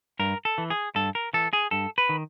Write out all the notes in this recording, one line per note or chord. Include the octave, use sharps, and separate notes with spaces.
G2 A#4
A4
E3
G#4
G2 A4
A#4
E3 A4
G#4
G2 A4
B4
D#3